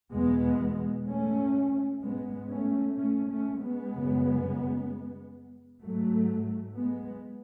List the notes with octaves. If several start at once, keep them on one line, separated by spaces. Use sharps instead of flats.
E2 B2 G#3 B3
A3 C#4
G#2 G#3 B3
A3 C#4
A3 C#4
A3 C#4
G#3 B3
F#2 C#3
G#2 F#3 A3
G#3 B3